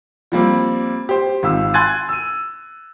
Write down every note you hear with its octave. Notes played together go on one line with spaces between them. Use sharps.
F3 G3 A#3 C4
G4 C5
G#1 F4 E6
G#5 C6 F#6 G#6 A6 D#7
E6 D#7